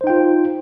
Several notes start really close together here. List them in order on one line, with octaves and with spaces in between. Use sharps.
C5 D#4 G5 F4